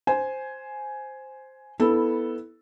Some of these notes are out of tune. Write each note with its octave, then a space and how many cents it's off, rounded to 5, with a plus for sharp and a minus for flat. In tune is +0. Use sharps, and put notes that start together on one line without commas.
C5 +0 G#5 +10
B3 +0 E4 -15 A4 +0